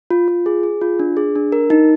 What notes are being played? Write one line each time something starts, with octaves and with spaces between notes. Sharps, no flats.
F4
F4
G#4
G#4
F4
D4
G#4
D4
A#4
D#4